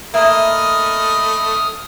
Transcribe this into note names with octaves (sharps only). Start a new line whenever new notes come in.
A3 A#3 D#5 E5 B5 D#6 F6